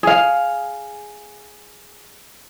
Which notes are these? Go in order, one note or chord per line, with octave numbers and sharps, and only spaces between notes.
G#4 F5